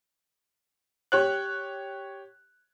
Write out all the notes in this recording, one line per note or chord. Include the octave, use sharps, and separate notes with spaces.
G4 C#5 F#6